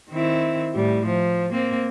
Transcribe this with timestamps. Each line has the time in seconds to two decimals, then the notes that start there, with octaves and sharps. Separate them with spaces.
0.11 D#3 C4 E4
0.75 A2 G3
1.06 F3
1.52 A#3 C4